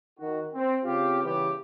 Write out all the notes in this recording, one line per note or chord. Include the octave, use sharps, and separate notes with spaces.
D#3 F#4
C4
C#3 C4 F4 G4
C#3 E3 G3 B3 G4